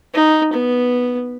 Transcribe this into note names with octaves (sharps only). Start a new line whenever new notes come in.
D#4
B3